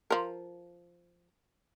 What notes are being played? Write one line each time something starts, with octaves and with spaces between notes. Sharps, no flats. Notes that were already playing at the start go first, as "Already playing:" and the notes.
F3 A#4